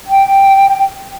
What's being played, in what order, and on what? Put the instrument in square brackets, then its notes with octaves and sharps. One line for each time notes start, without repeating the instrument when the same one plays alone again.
[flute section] G5